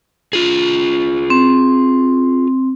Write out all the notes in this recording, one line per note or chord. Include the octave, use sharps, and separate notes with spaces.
F4 G#4
C4